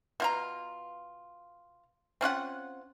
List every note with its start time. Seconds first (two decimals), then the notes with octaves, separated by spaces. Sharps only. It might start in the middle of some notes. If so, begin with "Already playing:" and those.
0.20 B2 F4 A#5
2.21 C4 C#4 F4 F#5